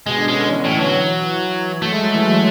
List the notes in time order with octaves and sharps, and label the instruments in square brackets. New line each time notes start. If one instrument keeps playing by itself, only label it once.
[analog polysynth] B2 [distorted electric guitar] G#3
[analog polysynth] D3
[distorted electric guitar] G#3 [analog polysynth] C#4
[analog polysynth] D3
E3
[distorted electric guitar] A2
F#3
[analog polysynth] F#3 [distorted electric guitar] A3
[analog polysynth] G#3
F#3
E3
F#3